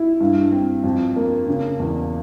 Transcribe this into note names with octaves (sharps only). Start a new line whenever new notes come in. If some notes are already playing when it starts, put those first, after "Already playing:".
Already playing: E4
G2
C4
F2
A#3
C#3
E2